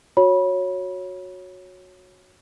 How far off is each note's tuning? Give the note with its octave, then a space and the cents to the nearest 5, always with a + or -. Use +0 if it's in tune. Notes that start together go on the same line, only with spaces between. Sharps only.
F#4 -15 C#5 -5 B5 -25